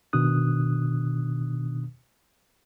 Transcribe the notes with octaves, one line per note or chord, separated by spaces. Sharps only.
B2 D#3 D4 D#6 F#6